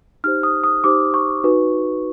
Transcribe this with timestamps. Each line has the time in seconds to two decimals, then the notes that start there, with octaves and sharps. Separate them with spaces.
0.24 D#4 G4 C5 F6
0.43 D#6
0.64 D#6
0.84 D#4 G4 C5 D6
1.14 C#6
1.44 D#4 F#4 B4